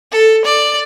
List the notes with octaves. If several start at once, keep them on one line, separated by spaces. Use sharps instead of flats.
A4
D5